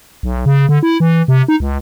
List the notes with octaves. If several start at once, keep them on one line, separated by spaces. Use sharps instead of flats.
B1
C#3
D3
E4
E3
C3
D#4
C#2